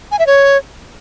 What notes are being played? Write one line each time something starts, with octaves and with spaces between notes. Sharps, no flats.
G#5
E5
C#5